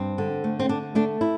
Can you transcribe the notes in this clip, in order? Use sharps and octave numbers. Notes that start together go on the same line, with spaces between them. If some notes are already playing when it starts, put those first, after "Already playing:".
Already playing: G2 C4
D3
A3
C4
D3 D4
A3 D4
E4